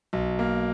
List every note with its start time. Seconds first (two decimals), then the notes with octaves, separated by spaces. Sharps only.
0.13 B1
0.39 A#3